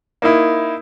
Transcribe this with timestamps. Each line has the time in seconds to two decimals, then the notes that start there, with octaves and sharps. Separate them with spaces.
0.22 A#3 D#4 E4